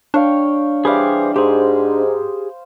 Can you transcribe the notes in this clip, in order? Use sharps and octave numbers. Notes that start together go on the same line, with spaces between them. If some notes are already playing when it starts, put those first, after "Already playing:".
D4 C#5 F5 G5
E3 G3 G#4 B4 C5 F5 D6
G#2 G4 G#4 C5